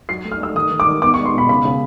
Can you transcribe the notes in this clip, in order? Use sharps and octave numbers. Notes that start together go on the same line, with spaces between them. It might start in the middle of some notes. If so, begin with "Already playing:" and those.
F#3 C7
A3
F6
A3 E6
D#3 D#6
D#3
D6
D#3
B3 D6
C#6
G#3
C6
B2 B5
C#3 B5
C#3